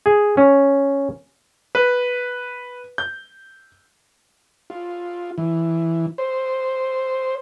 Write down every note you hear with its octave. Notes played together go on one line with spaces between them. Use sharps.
G#4
C#4
B4
G6
F4
E3
C5